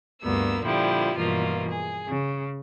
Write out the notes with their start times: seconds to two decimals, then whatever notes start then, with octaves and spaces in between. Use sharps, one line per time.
0.23 D2 G2 A#3 B3 E6
0.63 A#2 D3 F3 G3 E4
1.18 G2 B2 E3 F3 A#3 F4
1.70 G#4
2.09 C#3